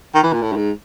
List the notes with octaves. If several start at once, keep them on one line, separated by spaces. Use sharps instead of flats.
D#3
E3
A#2
A2
G2
G#2